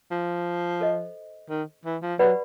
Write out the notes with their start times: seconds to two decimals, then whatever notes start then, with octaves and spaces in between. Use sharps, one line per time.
0.11 F3
0.81 A4 C5 D#5
1.50 D#3
1.85 E3
2.02 F3
2.19 F#3 G4 B4 D5 F#5 B5